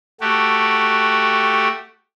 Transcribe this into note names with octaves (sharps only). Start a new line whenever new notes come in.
A3 F#4 G4